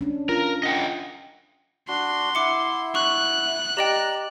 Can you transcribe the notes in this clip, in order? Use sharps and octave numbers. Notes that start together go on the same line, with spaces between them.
C#4 D4
F4 A#4
D#5 F#5 G5
D4 F#4 C6
E4 E5 F#5 D6 C#7
C#6 F#6
G4 D5 D#5 G5 A#5